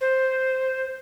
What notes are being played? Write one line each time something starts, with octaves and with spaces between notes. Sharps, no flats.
C5